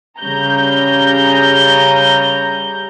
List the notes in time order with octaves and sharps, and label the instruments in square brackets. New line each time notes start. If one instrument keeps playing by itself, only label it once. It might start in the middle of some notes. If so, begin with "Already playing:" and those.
[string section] C#3 G3 A#5 G6